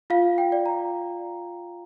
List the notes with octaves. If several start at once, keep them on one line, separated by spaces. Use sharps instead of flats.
F4 F5
G5
D5
A#5